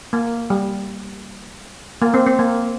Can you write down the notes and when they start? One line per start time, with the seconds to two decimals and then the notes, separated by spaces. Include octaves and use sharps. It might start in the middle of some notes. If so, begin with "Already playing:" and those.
0.13 A#3
0.50 G3
2.02 A#3
2.14 C4
2.27 C4
2.39 A#3